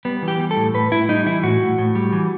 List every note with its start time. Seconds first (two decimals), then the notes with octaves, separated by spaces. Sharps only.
0.05 G3 B3
0.22 E3
0.28 G4
0.40 G3
0.51 A4
0.57 A2
0.74 A2 B4
0.92 A2 E4
1.09 G3 D#4
1.26 E3 E4
1.43 A2 F#4
1.61 A2
1.78 A2
1.95 G3
2.13 E3